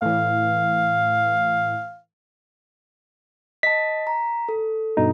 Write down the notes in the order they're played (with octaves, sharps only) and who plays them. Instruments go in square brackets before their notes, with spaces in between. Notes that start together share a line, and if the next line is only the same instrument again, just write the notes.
[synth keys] A2 E3 [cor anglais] F5
[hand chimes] D#5 A5 [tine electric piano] B6
[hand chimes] A#5
A4
[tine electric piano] G2 B2 D#4